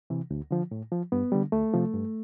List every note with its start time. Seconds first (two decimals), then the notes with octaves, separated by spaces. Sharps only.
0.10 C3 E3
0.31 D2
0.51 D3 F3
0.71 A2
0.92 F3
1.12 G2 B3
1.32 D3 G3
1.52 D2 A3
1.74 C3 F3
1.94 G2